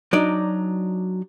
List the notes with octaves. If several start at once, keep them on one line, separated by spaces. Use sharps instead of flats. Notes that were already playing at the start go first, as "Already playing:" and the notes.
F#3 D4 D#4 D5